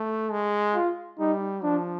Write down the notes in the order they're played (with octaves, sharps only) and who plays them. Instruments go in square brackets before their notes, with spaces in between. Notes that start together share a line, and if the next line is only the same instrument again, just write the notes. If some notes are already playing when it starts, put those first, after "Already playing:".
Already playing: [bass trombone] A3
G#3
[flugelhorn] F4
[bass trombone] G3 [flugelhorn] D#4
[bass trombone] F3 [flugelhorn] D4